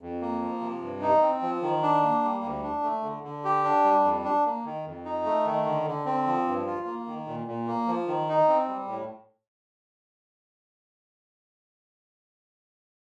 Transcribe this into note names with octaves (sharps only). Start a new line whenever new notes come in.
F2
A#3
F3
C3
G2
D#4
C4
F3
D#3
D4
A#3
G3
D2
D4
A3
D3
D3
G4
D4
G3
F2
D4
A#3
D#3
F2
D#4
A3
D#3
D3
D3
C4
F3
G2
F4
A#3
D#3
A#2
A#2
A#3
F3
D#3
D#4
C4
G3
A2